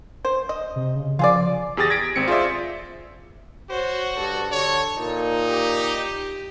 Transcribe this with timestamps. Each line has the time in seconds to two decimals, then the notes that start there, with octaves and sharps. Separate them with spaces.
0.25 C5
0.49 D#5
0.76 C3
0.96 C#3
1.19 F3 F4 G#4 D5
1.77 E2 G4 G#4 D#6 A6 A#6
1.90 G#6 A#6 B6 D7
2.16 G#1 C4 C#7
2.28 F4 G#4 C5 D5 E5
3.70 F#4 C5 C#5
4.18 G2 A4
4.52 D3 C#5
4.98 A#2 D#4
5.49 G4